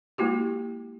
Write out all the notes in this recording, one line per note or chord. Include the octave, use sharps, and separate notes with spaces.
G#3 A#3 E4 F#4 G4